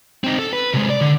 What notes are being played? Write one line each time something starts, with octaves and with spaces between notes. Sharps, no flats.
C4 D#4
A4
B4
C3 G#3
D5
D3